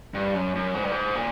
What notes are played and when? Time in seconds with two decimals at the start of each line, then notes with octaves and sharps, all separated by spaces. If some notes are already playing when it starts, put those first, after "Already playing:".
0.14 G2
0.35 F#2
0.55 F#2
0.75 G#2
0.83 G2
0.92 G#2
1.15 A#2